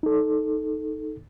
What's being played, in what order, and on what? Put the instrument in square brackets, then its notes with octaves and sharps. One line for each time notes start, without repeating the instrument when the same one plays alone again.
[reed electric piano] D#4 A4